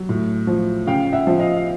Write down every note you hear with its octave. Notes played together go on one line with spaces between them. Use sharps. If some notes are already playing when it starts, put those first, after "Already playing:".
Already playing: F#3
A2
F3
C#3 F5 G5
E5 F#5
F3
D#5 F5
F5